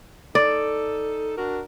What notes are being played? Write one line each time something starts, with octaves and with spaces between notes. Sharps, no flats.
D#4 A4 D5
D4 F#4 A#4